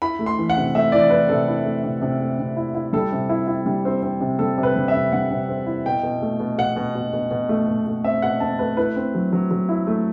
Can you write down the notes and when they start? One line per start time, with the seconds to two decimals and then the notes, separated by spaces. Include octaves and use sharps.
0.02 E4 B5
0.19 A3
0.26 C6
0.38 E3
0.50 F#5
0.57 C3
0.75 A3 E5
0.92 E3 D5
1.10 E3 B4
1.29 C3 A4
1.48 E4
1.65 A3
1.83 C3
2.02 C3
2.21 A3
2.39 C3
2.56 E4
2.75 E4
2.93 G3 A4
3.12 C3
3.29 E4
3.48 E4
3.66 G3
3.85 C4
4.03 C4
4.21 C3
4.39 G3 A4
4.58 C3
4.63 B4
4.76 G3
4.88 E5
4.94 C3
5.12 G3 F#5
5.31 C3
5.49 C4
5.67 E4
5.85 B2 G5
6.03 B2
6.22 A3
6.40 B2
6.58 B2 F#5
6.76 B2
6.95 B2
7.13 B2
7.31 B2
7.49 A3
7.67 B2
7.86 A3
8.04 C4 E5
8.22 B2 F#5
8.40 C4 A5
8.59 A3 B4
8.77 E4 B4
8.96 C4
9.14 F#3
9.33 F#3
9.51 F#3
9.69 E4
9.87 A3